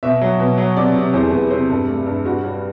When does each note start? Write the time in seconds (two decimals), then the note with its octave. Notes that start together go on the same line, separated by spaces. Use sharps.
0.03 B2 E5
0.21 F#3
0.39 B2
0.58 F#3
0.76 C3 D5
0.95 C3
1.14 E2 C5
1.27 A4
1.33 E2 B4
1.50 C3 C5
1.69 G2 A4
1.88 A3
2.06 G2
2.25 G2 F#4
2.44 G3